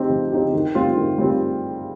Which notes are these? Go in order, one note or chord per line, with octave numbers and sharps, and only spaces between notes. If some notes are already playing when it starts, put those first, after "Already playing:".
Already playing: C4 D#4 G4
F3
C4 D#4 G4
D#3
G3 C4 F4
D#3
G3 C4 F4